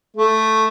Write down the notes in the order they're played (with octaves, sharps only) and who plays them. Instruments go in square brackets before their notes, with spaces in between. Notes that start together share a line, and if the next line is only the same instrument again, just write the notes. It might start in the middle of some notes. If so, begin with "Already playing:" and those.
[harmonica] A3